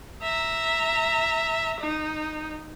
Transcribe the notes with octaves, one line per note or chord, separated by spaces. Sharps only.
E5 A#5
D#4